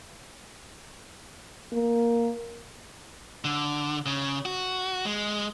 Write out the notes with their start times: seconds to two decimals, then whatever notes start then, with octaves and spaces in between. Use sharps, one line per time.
1.73 A#3
3.45 D3
4.06 C#3
4.45 F#4
5.05 G#3